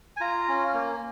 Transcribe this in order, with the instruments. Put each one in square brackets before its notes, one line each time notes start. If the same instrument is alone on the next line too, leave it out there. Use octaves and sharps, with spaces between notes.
[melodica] G#5
F4 A#5
C#4
A#3